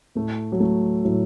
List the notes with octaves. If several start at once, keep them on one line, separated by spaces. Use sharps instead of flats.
A2 A3
F#3
A3
A2 F#3